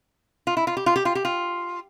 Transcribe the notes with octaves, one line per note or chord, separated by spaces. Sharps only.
F4
E4
F4
G4
F4
G4
F4
G4
F4